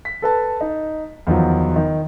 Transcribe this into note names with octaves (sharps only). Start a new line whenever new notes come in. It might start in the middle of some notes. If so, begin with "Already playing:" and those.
B6
A4 B4 A5
D#4
E2 D#3 F3 F#3
D#3